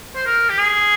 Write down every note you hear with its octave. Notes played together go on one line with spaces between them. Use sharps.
C5
A#4
G4
G#4